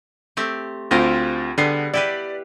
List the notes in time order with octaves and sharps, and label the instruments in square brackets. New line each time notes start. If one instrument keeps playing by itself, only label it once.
[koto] A3 C4 G4
[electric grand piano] D2 C4 F4 [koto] G4 A#4 D#5
[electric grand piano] D3 C7 [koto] G3 B3 G#4
[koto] E4 G4 B4 [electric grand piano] D5